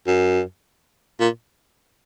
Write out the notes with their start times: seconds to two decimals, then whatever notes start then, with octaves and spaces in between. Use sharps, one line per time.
0.07 F#2
1.20 A#2